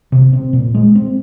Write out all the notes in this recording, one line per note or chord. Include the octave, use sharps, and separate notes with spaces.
C3
C4
A#2
G#3
C4